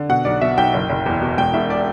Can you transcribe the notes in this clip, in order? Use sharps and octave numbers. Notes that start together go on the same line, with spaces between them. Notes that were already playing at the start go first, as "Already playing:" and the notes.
Already playing: D3
B2 F#5
B1 D5
B2 E5
B1 G5
F#1
F#1
E2
B2
E1 G5
E1 E5
D5